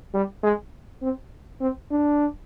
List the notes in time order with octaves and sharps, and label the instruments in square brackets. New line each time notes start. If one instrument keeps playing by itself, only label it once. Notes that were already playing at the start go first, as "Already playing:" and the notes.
[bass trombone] G3
G#3
C4
C4
D4